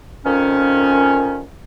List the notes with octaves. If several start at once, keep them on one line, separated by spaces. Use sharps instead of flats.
F2 A#2 D#3 C#4